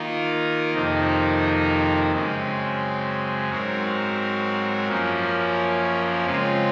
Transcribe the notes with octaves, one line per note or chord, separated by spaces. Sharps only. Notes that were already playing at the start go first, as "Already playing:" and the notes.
Already playing: D#3 A#3 F4 A#4
F2 C3 D#3 A#3 D#4
F#2 C#3 G#3 C4
G#2 F#3 C4 F#4 A#4
F#2 F3 A#3 C#4
C#3 G#3 C4 F4